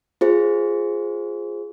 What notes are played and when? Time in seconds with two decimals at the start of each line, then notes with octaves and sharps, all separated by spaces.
0.21 F4 G#4 C5